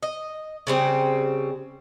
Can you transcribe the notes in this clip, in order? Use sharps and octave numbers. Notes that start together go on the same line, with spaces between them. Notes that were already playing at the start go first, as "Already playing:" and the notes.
D#5
C#3 G3 C4